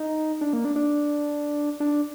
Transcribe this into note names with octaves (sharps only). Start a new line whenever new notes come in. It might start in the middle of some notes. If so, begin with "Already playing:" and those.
Already playing: D#4
D4
A#3
D4
D4
D4